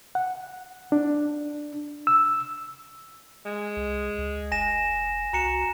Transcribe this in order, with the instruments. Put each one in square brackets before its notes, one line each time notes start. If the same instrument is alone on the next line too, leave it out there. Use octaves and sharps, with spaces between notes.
[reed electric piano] F#5
D4
E6
[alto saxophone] G#3
[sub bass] C2
C#2
[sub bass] F1 [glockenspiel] G#5 A#6 E7
[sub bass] C2 [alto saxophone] F#4 [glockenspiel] A#5 C#7 E7